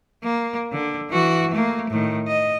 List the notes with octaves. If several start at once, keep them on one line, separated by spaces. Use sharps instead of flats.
A#3
D3
E3 F#4
A3 A#3
A2 D#3
D#5